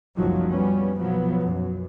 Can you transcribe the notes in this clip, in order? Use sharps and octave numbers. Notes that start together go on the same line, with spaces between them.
F#1 C2 D#3 F3 F#3
G3 B3 C#4
B1 F3 F#3 B3
F#2